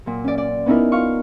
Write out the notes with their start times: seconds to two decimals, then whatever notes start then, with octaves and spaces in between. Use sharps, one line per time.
0.06 A#2 F#3
0.24 C#4 D5
0.38 D5
0.66 B3 C#4 D#4 E4 A#4
0.92 F4 F5 C#6